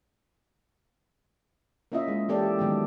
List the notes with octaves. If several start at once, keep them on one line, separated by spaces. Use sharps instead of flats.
A#3 C#4 E4 F4 D#5 E5
G#3
E3 A#3 G4 A4 D5
D#3 F#3 G#3 B3